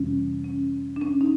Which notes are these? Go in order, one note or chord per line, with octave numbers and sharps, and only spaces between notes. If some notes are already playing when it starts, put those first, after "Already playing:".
Already playing: F2 C3 E3 G3 C#4
C#4
D4
C#4
D#4